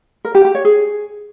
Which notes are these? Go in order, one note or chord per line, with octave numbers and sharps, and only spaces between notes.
A#4
G4
G4
C#5
G#4